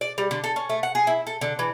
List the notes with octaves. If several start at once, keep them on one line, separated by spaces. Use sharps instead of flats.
D5
G3
D3
A4
C#4
A3
F#5
G#4
E4
A4
D3
E3